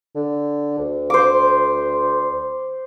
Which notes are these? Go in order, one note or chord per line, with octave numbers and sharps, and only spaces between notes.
D3
D2
C5 D6